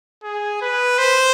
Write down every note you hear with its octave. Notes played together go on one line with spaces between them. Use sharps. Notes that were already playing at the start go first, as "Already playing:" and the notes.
G#4
B4
C5